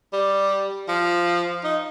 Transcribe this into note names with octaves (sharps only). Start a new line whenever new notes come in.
G3
F3
D#4